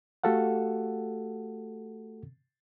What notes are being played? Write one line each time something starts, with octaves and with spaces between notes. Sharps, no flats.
A3 F#4 G4 A4 F5 F#5